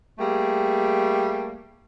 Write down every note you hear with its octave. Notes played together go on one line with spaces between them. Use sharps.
G3 A3 A#3 G#4